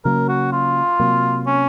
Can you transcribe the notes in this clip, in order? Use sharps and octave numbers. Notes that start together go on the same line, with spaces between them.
C#3 F#3 A#3 A#4
F#4
F4
C3 F#3 A#3
C#4